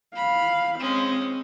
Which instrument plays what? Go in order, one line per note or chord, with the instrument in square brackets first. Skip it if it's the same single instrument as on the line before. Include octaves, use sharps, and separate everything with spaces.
[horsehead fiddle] F5 [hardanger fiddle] B5
[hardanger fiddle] G#3 C#4 [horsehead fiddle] C4